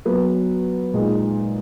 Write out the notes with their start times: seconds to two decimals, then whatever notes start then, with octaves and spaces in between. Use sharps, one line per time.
0.05 F#3 B3 F#4 B4
0.94 A#2 G#3 D#4 G#4